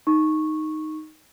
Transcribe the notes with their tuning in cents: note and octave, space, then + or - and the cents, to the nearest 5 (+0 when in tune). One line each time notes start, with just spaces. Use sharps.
D#4 +0 C#6 -10